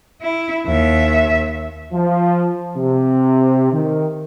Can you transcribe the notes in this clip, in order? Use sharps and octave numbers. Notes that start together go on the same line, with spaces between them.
E4
D#2 E5
F3
C3
D#3